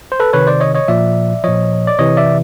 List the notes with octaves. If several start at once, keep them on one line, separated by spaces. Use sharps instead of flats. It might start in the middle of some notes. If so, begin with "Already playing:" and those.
C5
A4 B4
C3 D#3 B4 C#5
C5 D5
C#5 D#5
C#5 D#5
A#2 F3 D5 E5
A#2 F3 C#5 D#5
D5
C3 E3 C#5 D#5
D5 E5